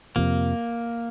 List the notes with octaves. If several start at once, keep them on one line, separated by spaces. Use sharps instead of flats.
F2 C3 F3 A#3